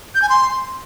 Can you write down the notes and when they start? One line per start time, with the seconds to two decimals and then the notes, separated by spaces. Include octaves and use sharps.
0.15 G6
0.22 G#5
0.29 C6